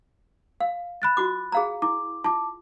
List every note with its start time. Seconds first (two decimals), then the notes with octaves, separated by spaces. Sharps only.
0.60 F5
1.02 B5 F#6 A6
1.17 F4 F#4 D6
1.52 G#4 F5 A#5
1.82 E4 D6
2.24 F4 A5 D6